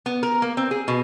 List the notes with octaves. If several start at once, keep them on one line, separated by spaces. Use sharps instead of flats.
B3
A#4
A#3
C4
G#4
B2